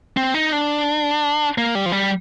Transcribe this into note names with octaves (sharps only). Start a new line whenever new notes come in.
C4
D#4
D4
A#3
G3
F3
G3